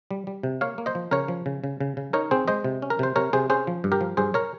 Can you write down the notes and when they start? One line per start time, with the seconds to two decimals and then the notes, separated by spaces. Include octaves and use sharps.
0.11 G3
0.27 G3
0.43 C3
0.61 A#3 C#5 F5
0.78 A#3
0.86 C5 D#5
0.95 F3
1.11 C#3 A#4 C#5
1.28 F3
1.46 C#3
1.64 C#3
1.81 C#3
1.97 C#3
2.13 D#4 A#4 C#5
2.31 C4 G#4 C5
2.48 G#3 C5 D#5
2.64 C3
2.82 C#4
2.90 A#4
2.99 C3 C5
3.16 C3 A#4 C#5
3.33 C3 G#4 C5
3.50 C#4 G#4 C5
3.67 F3
3.84 G2
3.92 G4 A#4
4.01 F3
4.17 G2 G#4 C5
4.34 A#4 C#5